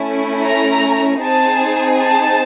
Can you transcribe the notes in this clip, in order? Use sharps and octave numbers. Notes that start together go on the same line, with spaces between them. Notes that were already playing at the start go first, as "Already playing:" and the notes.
Already playing: A3 C#4 E4
A#5
C4 D#4 G#4 A5
A5